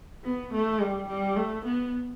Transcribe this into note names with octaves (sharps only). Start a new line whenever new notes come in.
B3
A3
G3
G3
A3
B3